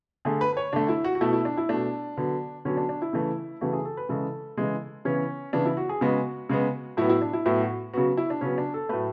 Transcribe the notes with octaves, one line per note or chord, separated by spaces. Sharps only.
D3 A3 G#4
B4
B4
C#5
D3 A3 D4
E4
F#4
F#4
B2 A3 E4
E4
D4
E4
B2 A3 D4
D3 F#3 B3
D3 F#3 B3 C#4
D4
D4
E4
C#3 E3 A3
C#3 E3 A3 F#4
G#4
A4
B4
C#3 E3 G#3 A4
C#3 E3 G#3
C#3 E3 B3 C#4
C#3 E3 B3 D4
E4
F#4
G#4
C#3 G#3 B3 F#4
C#3 G#3 B3
A2 F#3 B3 E4
E4
D4
E4
A2 F#3 B3 E4
F#4
C#3 F#3 B3 F#4
E4
D4
C#3 F#3 B3 C#4
D4
A4
A2 F#3 A3 B4